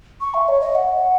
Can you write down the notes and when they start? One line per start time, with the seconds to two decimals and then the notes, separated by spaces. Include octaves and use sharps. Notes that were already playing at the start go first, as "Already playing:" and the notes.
0.21 C#6
0.34 E5
0.48 C#5
0.61 D#5
0.75 F#5